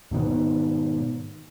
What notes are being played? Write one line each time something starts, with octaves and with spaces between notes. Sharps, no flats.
G#2 B2 D#3 B3